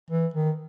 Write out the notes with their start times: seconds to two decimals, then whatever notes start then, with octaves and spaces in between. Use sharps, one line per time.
0.10 E3
0.34 D#3